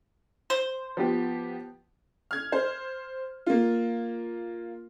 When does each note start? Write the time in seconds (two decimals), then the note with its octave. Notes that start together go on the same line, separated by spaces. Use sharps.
0.50 C5
0.97 F3 B3 G4
2.31 F6 G#6
2.52 C5
3.46 A#3 F4